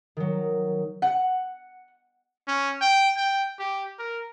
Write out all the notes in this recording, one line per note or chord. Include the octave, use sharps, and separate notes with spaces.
D#3 F#3
F#5
C#4
G5
G5
G4
A#4